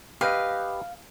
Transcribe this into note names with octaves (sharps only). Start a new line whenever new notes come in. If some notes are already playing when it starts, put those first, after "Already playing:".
G4 B4 D#5 F5